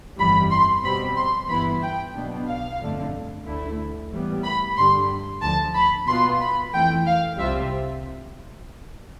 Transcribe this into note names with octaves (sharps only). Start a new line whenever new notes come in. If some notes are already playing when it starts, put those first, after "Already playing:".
G1 F2 E3 G3 B5
C6
B2 G3 C4 B5
C6
G1 G2 E3 B3 E4 B5
G5
B1 B2 B3 D4
F5
G1 F2 D3 A3 D4
D2 D3 A3 E4
A2 E3 G3 B3
B5
G2 D3 G3 C6
D2 D3 F3 A5
B5
B2 B3 F4 C6
B5
F2 E3 A3 G5
F5
C2 C3 G3 C4 F4 E5